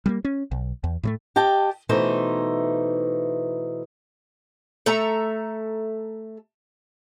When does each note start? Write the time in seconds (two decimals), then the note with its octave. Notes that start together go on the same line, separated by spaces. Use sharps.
0.06 G3 A3 A#3
0.25 C#4
0.51 B1
0.84 E2
1.03 A2 G3 A3
1.36 G4 D#5 G5 A5
1.89 B2 E3 A3 D#4 C5
4.86 A3 A4 E5 A#5